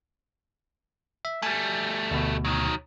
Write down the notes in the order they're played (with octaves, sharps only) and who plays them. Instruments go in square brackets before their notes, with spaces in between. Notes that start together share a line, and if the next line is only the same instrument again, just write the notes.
[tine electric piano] E5
[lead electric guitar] G3 A3 [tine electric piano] G#5
[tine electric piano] D2 B2
[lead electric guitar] D#3 F#3